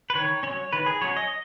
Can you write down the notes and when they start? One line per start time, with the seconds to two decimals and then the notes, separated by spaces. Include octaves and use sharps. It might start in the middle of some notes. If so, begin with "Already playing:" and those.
0.10 B4
0.15 D#3 C#5
0.43 F#3 C#4 C#5
0.73 D#3 B4
0.86 G#4
1.01 F#3 C#4 C#5
1.17 D#5